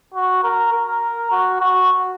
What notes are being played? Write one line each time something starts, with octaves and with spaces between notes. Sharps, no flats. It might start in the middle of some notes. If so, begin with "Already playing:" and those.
F#4
A#4
A#4
F#4
F#4